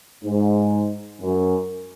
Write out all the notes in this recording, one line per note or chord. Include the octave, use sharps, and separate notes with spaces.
G#2
F#2